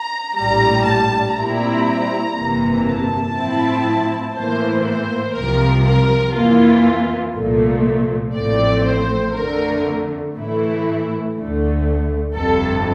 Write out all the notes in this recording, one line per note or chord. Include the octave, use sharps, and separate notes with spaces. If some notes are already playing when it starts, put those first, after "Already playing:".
Already playing: A#5
A#1 A2 G3 A#5
A5
A#2 G3 C4 E4 A#5
G1 F2 C3 E3 A#3
A5
A2 F3 C4 E4
A2 E3 A#3 C5
C5
C2 C3 F3 A#4
A#4
F2 E3 A#3 F4
C2 A#2 F3 A3
A1 A2 F3 A3 C4 D5
C5
F2 D3 A3 A#4
A2 E3 A3 E4
D2 D3 A3
G1 F2 C3 A4